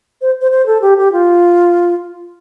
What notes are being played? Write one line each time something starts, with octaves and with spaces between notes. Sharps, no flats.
C5
C5
C5
A4
G4
G4
F4